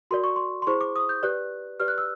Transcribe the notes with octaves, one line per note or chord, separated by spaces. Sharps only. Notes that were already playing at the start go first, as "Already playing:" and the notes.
F#4 A#4 D5 C6
C#6
C6
C6
E4 G#4 C5 C#6
D6
D#6
G6
G4 B4 D5 F#6
G4 B4 D5 F6
F#6
E6